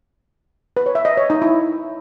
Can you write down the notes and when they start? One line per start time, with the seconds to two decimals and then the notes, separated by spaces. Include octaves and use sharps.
0.77 B4
0.86 C#5
0.95 E5
1.05 D#5
1.17 C#5
1.30 D#4
1.42 E4